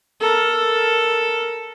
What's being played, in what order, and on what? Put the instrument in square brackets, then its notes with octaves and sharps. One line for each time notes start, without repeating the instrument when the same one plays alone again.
[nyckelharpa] A4 A#4